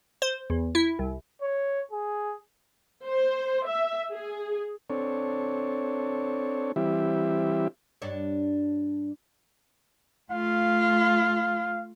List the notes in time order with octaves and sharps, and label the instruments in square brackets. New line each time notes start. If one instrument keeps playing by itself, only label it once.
[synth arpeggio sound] C5
E2
E4
C2
[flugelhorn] C#5
G#4
[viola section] C5
E5
G#4
[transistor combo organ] C4 D4 A4 C#5
E3 G3 C4 E4 G4 E5
[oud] G2 D4 C#5
[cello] A3 F4 [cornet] F5